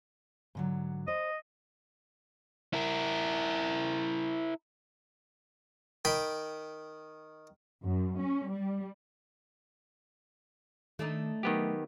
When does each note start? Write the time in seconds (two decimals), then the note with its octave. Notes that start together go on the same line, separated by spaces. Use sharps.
0.55 G#2 D3 F#3
1.08 C5 D#5
2.73 E4 A#4
6.05 D#3 G5 B5
7.86 F#2
8.20 C#4
8.51 G3
10.99 D#3 A3 D4 D#4
11.43 D#3 F#3 B3 G4